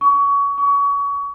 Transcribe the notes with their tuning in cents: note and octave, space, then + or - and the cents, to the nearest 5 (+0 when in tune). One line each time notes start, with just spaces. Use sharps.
C#6 +25
C#6 +30